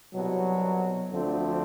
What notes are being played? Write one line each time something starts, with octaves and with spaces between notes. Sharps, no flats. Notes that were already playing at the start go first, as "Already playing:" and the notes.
C2 B2 F#3
D2 D3 F3 A3 C4